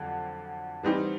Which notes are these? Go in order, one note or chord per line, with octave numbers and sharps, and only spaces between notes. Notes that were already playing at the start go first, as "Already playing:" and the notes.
Already playing: F2 D3 F#3
E3 G3 C4 D#4